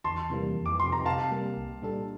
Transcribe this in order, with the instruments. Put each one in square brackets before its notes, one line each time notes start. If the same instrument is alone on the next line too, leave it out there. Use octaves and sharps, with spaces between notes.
[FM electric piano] E2 [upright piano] A5 C6
[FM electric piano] C3 E3 G3 A#3
F2
[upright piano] D6
[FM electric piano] C3 F3 [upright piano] C6
[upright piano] A#5
[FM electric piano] C3 [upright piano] F5 A5
[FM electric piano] G3 A#3
C2
A#2 G3 D4 A4